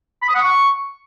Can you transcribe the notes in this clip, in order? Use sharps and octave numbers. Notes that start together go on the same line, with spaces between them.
B5
D#6
F#5
C#6